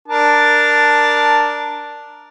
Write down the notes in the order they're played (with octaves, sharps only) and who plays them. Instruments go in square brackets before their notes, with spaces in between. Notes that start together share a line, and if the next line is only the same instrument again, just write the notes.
[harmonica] D4 A#4 A5